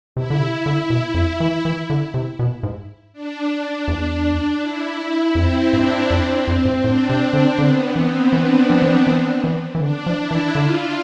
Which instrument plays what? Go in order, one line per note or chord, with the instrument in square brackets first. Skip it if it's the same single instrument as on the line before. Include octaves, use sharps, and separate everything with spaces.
[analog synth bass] C3 [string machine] E4
[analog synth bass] D3
C3
D3
B2
F2
E3
E3
D3
C3
B2
G#2
[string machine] D4
[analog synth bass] E2
[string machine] E4
E4
[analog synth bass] F2 [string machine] C4
[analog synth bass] G#2 [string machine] D4
[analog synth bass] F2 [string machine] C4
[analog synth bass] F2 [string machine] C4
[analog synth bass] G#2
[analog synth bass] A2 [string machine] D4
[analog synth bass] C3
[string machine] C4
[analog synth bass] D3
[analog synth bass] D3 [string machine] B3
[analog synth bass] E3 [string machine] C4
[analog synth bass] E3 [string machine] D4
[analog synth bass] F3
E3
F3
E3
E3
E3
[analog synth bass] D3 [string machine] D4
[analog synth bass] F3
[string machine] E4
[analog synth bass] E3
[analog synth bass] D3 [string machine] F4